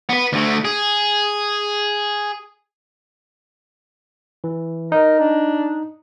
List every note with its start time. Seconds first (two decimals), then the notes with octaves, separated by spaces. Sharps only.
0.09 B3 B4
0.33 D2 A3
0.65 G#4
4.44 E3
4.92 D#4 A#4 D#5
5.20 D4